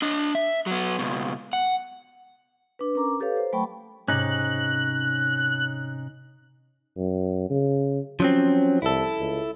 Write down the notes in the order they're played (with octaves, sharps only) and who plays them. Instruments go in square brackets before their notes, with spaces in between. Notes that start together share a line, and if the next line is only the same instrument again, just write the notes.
[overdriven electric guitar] D4 D#5
E5
F#3 B3
C#2 B2
F#5
[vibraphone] D4 B4
C#4 A#4 A#5 D6
G4 A4 B4 C#5 F5
C5
F#3 A3 G5 A5 B5 C#6
[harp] G#2 C3 [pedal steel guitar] C#4 D#4 [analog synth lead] F#6
[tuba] F#2
C#3
[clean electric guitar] F3 F#3 C4 [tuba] C#4
[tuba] C2 [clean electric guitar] E4 A4
[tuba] C#2